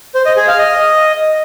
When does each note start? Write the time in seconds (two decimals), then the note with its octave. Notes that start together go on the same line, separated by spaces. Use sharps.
0.15 C5
0.26 D#5
0.37 G#4
0.48 F5
0.59 D#5